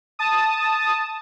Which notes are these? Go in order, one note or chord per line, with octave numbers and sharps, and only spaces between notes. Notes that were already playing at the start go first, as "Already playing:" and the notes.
A5 D#6